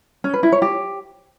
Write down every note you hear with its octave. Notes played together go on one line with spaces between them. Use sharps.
C#4
B4
E4
C#5
G4